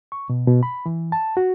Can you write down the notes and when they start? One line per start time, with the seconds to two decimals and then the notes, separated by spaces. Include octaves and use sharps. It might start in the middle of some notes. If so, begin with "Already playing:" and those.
0.12 C#6
0.30 B2
0.47 B2
0.63 B5
0.86 E3
1.12 A5
1.37 F#4